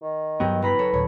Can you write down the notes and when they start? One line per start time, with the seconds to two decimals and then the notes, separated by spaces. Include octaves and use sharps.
0.02 D#3
0.40 G2 F#3 B3 G5
0.62 F#1 B4 A#5 B5
0.79 A4 C#5
0.94 D1 C#5